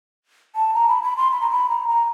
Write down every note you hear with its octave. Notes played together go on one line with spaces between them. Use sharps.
A5
A#5
B5
B5
C6
B5
A#5
B5
A#5
A#5